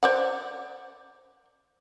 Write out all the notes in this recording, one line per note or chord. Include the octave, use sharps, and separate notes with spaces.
C5 D5 F#5